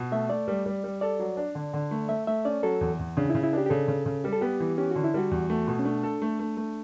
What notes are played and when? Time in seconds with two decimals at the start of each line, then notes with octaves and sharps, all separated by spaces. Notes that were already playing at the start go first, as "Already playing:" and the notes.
Already playing: B2
0.12 A3 E5
0.30 A3 D5
0.48 G3
0.66 G3
0.84 G3
1.01 A4 D5
1.19 F#3
1.37 D4
1.55 D3
1.73 D3
1.91 A3
2.09 A3 E5
2.27 A3 E5
2.45 C#4 D5
2.63 F#3 A4
2.81 E2
2.99 E2
3.17 C#3 D4
3.30 E4
3.35 C#3
3.43 E4
3.53 D4 G4
3.66 G4
3.70 C#3 A4
3.88 C#3
4.06 C#3
4.24 G3 G4
4.33 A4
4.41 B3 G4
4.60 E3
4.78 C#4 G4
4.91 D3 F#4
5.04 E4
5.14 G3 F#4
5.31 E2
5.50 A3
5.68 B2
5.79 C#4
5.85 A3 D4
6.03 A4
6.22 A3
6.39 A3
6.57 A3